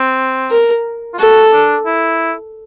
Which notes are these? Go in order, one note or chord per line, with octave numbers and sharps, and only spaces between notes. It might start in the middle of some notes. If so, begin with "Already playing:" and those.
Already playing: C4
A#4
F4
F#4 A4
D4
E4